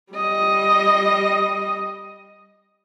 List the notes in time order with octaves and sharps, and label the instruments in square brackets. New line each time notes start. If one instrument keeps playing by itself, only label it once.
[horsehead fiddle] G3 D#5